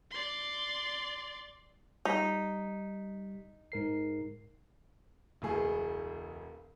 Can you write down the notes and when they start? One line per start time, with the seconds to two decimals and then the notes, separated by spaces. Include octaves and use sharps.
0.11 D5 C6
2.05 G3 D#4 B6
3.72 G#2 A#4 C7
5.42 E1 C#2 A3 G#4